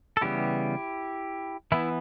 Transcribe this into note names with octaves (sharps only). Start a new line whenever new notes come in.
A4
C#3 E3 G3 B3 E4 G4
E3 B3 E4